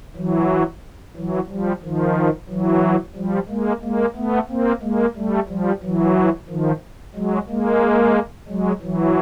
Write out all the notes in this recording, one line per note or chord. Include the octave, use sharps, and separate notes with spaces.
E3 F#3
E3 F#3
F3 G3
D#3 F3
E3 F#3
F3 G3
G#3 A#3
G#3 A#3
A3 B3
A#3 C4
G#3 A#3
G3 A3
F3 G3
E3 F#3
D#3 F3
F#3 G#3
G#3 A#3
F#3 G#3
E3 F#3